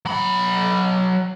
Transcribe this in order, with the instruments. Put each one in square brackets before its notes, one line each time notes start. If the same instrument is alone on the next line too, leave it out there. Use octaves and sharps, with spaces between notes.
[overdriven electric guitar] F#3 B5